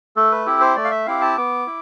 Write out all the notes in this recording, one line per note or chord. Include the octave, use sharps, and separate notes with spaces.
A3 A4
B4
C4 E4 G4 A4
C5
A3 D5
F5
E5
C4 E4 G4 F5
A5
B3 D6
E4